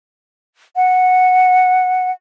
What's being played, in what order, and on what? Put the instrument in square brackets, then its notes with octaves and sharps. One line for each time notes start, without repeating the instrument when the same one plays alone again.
[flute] F#5